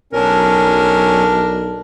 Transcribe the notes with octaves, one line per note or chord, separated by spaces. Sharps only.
B1 F#3 C#4 D4 A#4